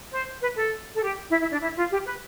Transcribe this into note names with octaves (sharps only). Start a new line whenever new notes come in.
C5
B4
A4
A4
G4
E4
E4
D4
E4
F4
G4
B4